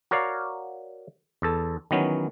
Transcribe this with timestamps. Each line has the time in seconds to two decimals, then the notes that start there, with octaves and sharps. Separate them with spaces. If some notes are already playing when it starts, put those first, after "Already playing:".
0.11 F#4 A#4 C#5 D5 F5
1.42 E2 A4
1.91 D#3 E3 F#3 B3 C#4